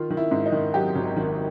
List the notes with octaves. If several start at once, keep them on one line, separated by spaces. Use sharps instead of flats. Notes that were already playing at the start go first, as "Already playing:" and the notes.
Already playing: D#3 F4
D#3
E4
G#2
D#4
D#3
F#3 G4
G#1
D#3